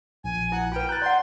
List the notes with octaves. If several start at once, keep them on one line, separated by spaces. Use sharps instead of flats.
A#1 G#5
E4 F#5
F4 B4 G5
A#5 F#6 G6 A6
D5 F#5 C6